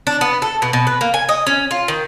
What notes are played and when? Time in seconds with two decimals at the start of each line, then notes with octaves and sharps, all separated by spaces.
0.07 D4
0.21 B3
0.42 A4
0.62 B2
0.73 B2
0.87 B4
1.01 A#3
1.14 G#5
1.29 D#5
1.47 C#4
1.71 F4
1.88 D#3